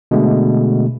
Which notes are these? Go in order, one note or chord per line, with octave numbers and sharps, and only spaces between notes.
B2 D3 G#3 A3